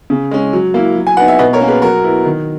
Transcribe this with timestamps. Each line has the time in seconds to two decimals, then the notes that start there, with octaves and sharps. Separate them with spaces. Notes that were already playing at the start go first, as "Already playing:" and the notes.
0.10 C#3
0.31 G#3 C#4
0.53 F#3
0.74 A#3 E4
0.96 F#3
1.07 G#5
1.17 B3 D#4 F#5
1.28 E5
1.39 B2 B4 D#5
1.53 A#4 C#5
1.61 A#3 C#4
1.68 G#4 B4
1.82 F#3 F#4 A#4
2.04 B3 E4
2.25 D#3